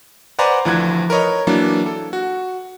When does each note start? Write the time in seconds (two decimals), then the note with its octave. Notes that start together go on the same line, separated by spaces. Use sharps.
0.39 B4 C5 D5 F#5 G#5 A#5
0.65 D2 E3 F3 E4 F#6 G#6
1.10 A#4 B4 C#5 D#5
1.47 E3 F#3 A#3 D4
1.86 A4
2.13 F#4